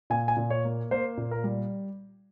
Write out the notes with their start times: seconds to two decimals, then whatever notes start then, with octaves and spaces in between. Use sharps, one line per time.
0.10 A#2 G#5
0.28 G#5
0.37 A#2
0.50 C#5
0.65 A#3
0.91 A#3 C5
1.18 A#2
1.31 A#4
1.44 G3